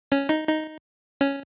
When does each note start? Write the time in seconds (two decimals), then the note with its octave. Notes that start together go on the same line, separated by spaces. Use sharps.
0.12 C#4
0.29 D#4
0.47 D#4
1.21 C#4